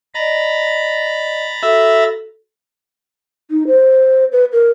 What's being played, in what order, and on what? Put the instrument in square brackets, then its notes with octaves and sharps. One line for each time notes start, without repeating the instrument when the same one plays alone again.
[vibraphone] D5 D#5 [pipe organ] A#5 B5 A6
[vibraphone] F#4 A4 [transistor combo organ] E5
[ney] D#4
C5
B4
A#4